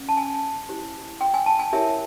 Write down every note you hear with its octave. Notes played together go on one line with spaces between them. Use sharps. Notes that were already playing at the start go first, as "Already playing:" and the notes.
Already playing: C#4
A5
G#5
E4 G4 C5
G5
G#5
A5
G#5
E4 G4 A#4 C#5 E5